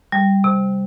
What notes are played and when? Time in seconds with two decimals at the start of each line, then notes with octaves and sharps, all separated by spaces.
0.12 G3
0.44 C3